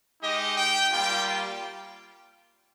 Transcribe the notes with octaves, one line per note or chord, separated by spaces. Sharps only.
G#3 D#4 G4 D#5
G5
G3 A#3 F4 G5